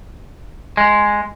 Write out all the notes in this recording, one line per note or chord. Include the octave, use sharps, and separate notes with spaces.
G#3